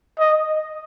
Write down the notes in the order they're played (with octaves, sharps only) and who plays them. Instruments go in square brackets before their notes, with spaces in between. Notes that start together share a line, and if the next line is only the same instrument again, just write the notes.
[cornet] D#5